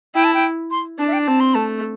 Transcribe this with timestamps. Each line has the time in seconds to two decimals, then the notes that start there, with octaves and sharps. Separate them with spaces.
0.15 E4 G5
0.24 A5
0.34 G5
0.71 C6
0.99 D4 A5
1.08 E5
1.13 G5
1.27 C4 A5
1.40 C6
1.54 A3 A5